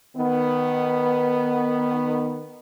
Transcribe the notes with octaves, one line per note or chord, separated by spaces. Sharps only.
D#3 B3